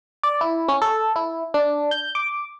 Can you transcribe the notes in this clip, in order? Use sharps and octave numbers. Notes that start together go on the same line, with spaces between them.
D5
E4
C#4
A4
E4
D4
G6
D6